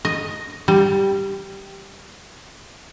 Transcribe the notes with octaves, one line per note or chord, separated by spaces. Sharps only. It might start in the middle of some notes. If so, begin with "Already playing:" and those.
D#5
G3